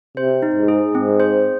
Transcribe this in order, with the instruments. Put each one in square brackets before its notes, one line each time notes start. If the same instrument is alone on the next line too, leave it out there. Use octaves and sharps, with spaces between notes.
[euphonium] C3 [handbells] C5
[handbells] D#4
[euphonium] G#2
[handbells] G#4
[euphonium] G#2 [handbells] C4
[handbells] C5